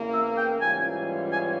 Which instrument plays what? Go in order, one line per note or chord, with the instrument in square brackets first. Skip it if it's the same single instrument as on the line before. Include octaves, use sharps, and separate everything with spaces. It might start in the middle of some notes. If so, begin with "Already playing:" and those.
Already playing: [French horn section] E2 C#3 E3 A#3
[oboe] E5
G5
[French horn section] G#2 E3 G3 C#4 F4 [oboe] G#5
[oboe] G#5